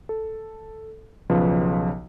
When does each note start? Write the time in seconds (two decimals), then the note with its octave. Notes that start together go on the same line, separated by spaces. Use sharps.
0.09 A4
1.30 B1 C#3 F3 B4